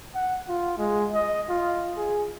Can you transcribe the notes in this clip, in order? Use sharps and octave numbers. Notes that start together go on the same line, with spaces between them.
F#5
F4
G#3
D#5
F4
G#4